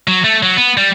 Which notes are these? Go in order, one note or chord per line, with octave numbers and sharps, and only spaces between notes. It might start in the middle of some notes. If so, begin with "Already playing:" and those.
F#3
A3
F#3
B3
G3